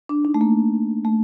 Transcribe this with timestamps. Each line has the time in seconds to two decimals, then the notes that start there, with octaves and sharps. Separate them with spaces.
0.09 D4
0.25 D#4
0.34 A3
0.41 A#3
1.05 A3